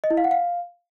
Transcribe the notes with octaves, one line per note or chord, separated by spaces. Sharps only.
D#5
E4
F5
F#5
F5